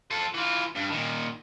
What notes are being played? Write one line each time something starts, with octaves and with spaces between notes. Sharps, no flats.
F4 A4
E3 F4
G2
A#2 D#3